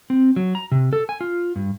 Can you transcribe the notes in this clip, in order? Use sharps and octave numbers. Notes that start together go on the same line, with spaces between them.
C4
F#3
A#5
C3
A4
G#5
F4
G2